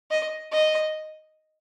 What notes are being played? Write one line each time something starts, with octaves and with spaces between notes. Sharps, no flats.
D#5
D#5